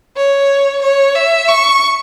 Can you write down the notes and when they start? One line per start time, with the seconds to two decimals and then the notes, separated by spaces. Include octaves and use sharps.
0.16 C#5
0.82 C#5
1.15 E5
1.48 C#6